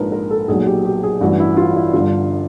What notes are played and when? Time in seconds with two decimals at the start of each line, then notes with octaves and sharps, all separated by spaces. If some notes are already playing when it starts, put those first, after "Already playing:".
Already playing: A#1 G#2 F3 A#4 B4
0.12 A#4
0.31 A4
0.48 B1 A#2 F#3 G#4
0.66 G4
0.85 G4
1.03 G#4
1.21 A1 G2 E3 F#4
1.40 E4
1.57 F4
1.76 E4
1.93 G1 G2 D3 F4